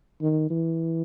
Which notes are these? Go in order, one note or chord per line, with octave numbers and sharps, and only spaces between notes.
D#3
E3